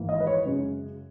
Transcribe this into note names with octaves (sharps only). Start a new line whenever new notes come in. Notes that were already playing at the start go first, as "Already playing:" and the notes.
Already playing: G#1 G#2 E3 A#3
D#5
B4
C#5
F#2 C#3 G#3